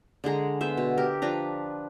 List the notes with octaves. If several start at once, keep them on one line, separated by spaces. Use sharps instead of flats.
D3 G#3 G#4 A#5
B3 C5 E5
B2
G4 A#4
F3 D4 B4 A#5